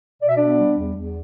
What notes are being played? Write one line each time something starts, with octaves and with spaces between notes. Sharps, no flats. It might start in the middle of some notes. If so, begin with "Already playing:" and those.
B2 D5
E5
B3 D4 D5
G3
E2
E2